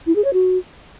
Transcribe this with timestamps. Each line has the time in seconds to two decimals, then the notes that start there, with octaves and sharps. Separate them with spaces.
0.06 E4
0.15 G#4
0.24 C#5
0.33 F#4